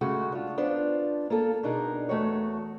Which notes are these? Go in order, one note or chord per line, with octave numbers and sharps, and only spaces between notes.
C#3 G#3 A3 F#4
D4 F4
B3 D4 F4 C5
A#3 F4 A4
B2 D4 D#4 G#4 A#4
E2 A3 F#4 C#5